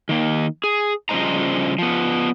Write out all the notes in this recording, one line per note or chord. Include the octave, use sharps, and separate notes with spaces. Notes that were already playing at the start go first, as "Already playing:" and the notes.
D#3 A#3
G#4
C#3 F3 G3 C5 D#5 A#5
F3 B3